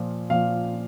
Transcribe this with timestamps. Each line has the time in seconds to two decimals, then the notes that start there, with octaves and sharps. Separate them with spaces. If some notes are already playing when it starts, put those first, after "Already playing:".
Already playing: A#2 F3
0.30 A#2 F3 F5